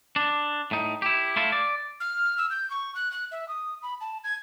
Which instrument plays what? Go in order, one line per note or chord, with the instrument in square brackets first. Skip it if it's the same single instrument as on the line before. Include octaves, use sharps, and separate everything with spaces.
[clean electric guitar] D4
A2 D#4
E4 G4
A3 E4 F4
D5
[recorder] F6
E6
G6
C#6
F#6
F#6
E5
D#6
B5
A5
G#6